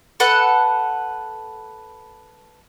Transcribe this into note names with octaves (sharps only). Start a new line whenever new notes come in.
A4 B4 F#5